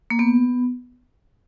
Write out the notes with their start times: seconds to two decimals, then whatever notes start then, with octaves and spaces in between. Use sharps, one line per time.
0.10 A#3
0.19 B3